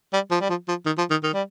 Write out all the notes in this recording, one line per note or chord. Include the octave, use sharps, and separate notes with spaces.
G3
F3
G3
F3
F3
D#3
F3
D#3
D#3
G3